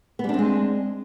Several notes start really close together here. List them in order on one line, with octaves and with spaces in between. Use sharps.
B3 G3 D4 C4 G#3